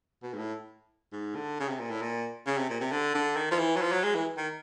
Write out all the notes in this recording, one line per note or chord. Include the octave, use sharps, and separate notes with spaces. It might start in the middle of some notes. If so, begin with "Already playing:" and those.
B2
G#2
A2
G#2
D3
C#3
C3
A#2
A2
A#2
C#3
C3
A#2
C3
D3
D3
D#3
F3
E3
F#3
F3
F#3
G#3
E3
D#3